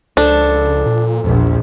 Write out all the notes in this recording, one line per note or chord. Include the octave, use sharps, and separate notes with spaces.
C#2 F3 D4 A4 C5
A#2
A#1 E2